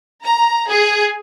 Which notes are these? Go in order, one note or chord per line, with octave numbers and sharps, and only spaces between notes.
A#5
G#4